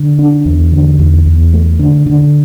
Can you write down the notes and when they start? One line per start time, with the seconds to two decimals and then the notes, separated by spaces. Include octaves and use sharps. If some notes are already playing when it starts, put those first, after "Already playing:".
Already playing: D3
0.19 D4
0.46 E2
0.72 D3
0.99 E2
1.26 E2
1.53 A3
1.79 D3
2.06 D3